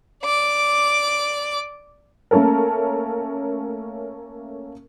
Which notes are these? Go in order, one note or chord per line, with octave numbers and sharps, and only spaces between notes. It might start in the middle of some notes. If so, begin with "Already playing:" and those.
D5 D6
A3 A#3 C#4 A4 A#4